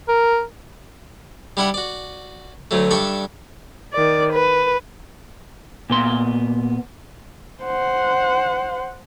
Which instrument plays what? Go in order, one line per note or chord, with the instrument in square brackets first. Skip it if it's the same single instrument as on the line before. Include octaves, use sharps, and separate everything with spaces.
[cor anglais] A#4
[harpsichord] G3 D4 E4 G4 F#5
F#4 D5
D2 F#3 A3
G2 D4 A4 E5 C#6
[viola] D#3 D5
B4
[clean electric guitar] A#2 B3 C6
[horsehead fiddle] C5 F#5